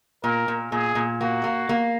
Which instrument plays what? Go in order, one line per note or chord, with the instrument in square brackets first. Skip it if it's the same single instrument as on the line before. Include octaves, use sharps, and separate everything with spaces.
[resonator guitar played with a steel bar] A#2 [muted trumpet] A#4
[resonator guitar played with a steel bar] A#2
[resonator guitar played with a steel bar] A#2 [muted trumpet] G#4
[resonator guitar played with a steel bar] A#2
[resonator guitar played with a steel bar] A#3 [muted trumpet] F#4
[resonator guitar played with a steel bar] A#3
A#3